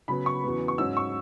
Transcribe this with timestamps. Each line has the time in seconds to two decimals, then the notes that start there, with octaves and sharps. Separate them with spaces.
0.08 C#3 F#3 B3 B5
0.26 C#6
0.44 E2 C#3 F#3 B3
0.68 C#6
0.78 G#2 F#3 C#4 E6
0.97 C#6